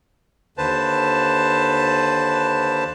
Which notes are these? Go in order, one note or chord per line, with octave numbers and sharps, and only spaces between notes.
D#2 D3 B4 C5 A5